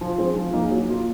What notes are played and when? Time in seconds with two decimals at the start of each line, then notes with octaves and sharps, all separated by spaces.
0.01 F3
0.18 G#3 C4
0.36 F3
0.53 A#3 D#4 G#4
0.71 F#3
0.89 A#3 F4